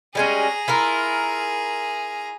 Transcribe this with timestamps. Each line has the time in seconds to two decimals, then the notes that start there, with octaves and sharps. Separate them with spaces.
0.15 G3 G#3 C#4 G#4 A#5
0.68 E4 F4 A#4